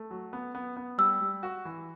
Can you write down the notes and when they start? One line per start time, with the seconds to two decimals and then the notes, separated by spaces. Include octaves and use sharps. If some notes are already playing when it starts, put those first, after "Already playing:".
Already playing: A3
0.11 F#3
0.33 B3
0.55 B3
0.77 B3
0.98 G3 E6
1.21 G3
1.43 F#4
1.65 E3